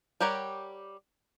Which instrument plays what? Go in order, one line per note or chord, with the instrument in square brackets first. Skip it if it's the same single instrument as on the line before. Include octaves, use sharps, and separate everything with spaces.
[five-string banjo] G3 G4 A#4 C#5 F#5